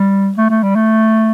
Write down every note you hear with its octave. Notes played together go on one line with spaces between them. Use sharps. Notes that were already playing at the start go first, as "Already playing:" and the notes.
Already playing: G3
A3
A3
G3
A3